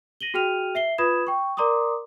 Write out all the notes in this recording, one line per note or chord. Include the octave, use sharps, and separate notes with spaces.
A#6 D#7 F#7 G7
F#4 G#4 G5 F6 D#7 F7
E5 C7 G7
F4 B4 B5 D#6 G#6 E7
G5 C#6
A#4 D5 A#5 C6 D6 D#6